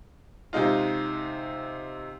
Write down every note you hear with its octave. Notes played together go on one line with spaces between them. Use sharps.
C3 G#3 D#4 F4